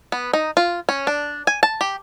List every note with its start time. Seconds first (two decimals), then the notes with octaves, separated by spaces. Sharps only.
0.12 B3
0.33 D#4
0.57 F4
0.89 C#4
1.07 D4
1.47 G#5
1.63 A5
1.81 G4